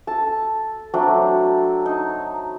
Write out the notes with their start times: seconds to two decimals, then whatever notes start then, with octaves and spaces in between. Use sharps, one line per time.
0.07 A4 A5
0.94 F#3 A3 C4 D4
1.86 D#4